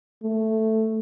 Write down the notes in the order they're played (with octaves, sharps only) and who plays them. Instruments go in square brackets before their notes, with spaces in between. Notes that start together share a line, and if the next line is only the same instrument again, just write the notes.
[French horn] A3